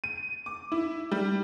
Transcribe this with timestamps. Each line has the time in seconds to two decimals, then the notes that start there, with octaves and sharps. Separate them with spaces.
0.04 D#7
0.46 D6
0.72 E4
1.12 G3